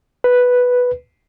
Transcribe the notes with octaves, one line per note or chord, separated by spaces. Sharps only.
B4